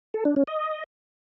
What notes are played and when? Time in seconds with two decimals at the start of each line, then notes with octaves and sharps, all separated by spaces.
0.14 A4
0.25 D4
0.36 C#4
0.47 D#5